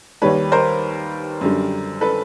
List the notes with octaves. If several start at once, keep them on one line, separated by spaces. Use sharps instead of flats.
D#2 D#3 G3 B4 C#5
A#4 C5
F#2 D3 G3
A4 B4